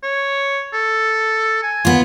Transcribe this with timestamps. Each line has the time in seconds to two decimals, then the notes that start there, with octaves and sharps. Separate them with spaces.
0.03 C#5
0.73 A4
1.63 G#5
1.85 D#2 B3 F4